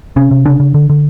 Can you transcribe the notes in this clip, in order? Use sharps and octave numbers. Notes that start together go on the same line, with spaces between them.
C3 C#4
C3
C#3 D4
C#3
D3
D3